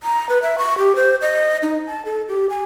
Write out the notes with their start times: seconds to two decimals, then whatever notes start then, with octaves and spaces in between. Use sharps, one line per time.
0.03 A#5
0.29 B4
0.42 E5
0.58 C#6
0.78 G4
0.96 C5
1.22 D#5
1.62 D#4
1.87 A5
2.05 A4
2.29 G4
2.50 G#5